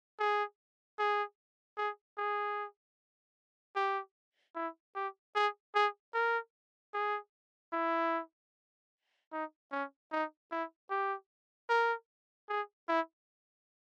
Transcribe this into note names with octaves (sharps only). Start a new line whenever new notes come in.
G#4
G#4
G#4
G#4
G4
E4
G4
G#4
G#4
A#4
G#4
E4
D#4
C#4
D#4
E4
G4
A#4
G#4
E4